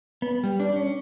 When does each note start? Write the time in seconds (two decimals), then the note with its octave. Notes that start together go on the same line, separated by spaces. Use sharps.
0.22 B3
0.43 G3
0.60 D4
0.76 C#4